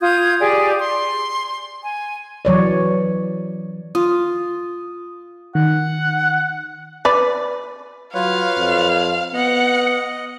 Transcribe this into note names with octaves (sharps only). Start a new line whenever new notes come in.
F4 D#6 G6 G#6
G4 G#4 D5
C6
G#5
E3 F#3 C#5 D5
F4 D#6
D#3 F#5
B4 D5
F#3 F4 B4 C#5 F5
F2
B3 D#5 F#5